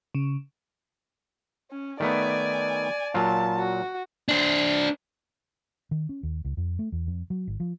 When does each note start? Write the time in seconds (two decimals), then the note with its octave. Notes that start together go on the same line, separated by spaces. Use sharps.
0.15 C#3
1.71 C#4
2.00 D#3 A3 B3 D5 G#5
3.14 A#2 F#3 F4 A5
3.58 F#4
4.28 D4 C5
5.91 D#3
6.09 C#4
6.23 D#2
6.45 C#2
6.57 F2
6.79 A3
6.92 E2
7.07 F2
7.30 F#3
7.48 G#1
7.60 F3